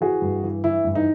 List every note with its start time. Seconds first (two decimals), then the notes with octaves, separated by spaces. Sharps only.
0.01 E3 F#4 G#4
0.22 G2
0.43 E3
0.64 E3 E4
0.84 G2
0.95 D#4